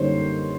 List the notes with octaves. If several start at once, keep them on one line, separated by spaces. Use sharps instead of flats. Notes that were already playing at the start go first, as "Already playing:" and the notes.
Already playing: F#2 D3 G3 A#3 D#4 C5 C#5